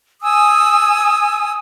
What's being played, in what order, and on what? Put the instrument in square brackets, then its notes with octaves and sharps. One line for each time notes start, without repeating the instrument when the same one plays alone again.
[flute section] G#5 D#6 E6